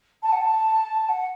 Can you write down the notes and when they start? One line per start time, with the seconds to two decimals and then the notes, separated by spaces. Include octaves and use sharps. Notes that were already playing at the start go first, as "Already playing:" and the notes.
0.22 A5
0.32 F#5
0.41 A5
1.09 F#5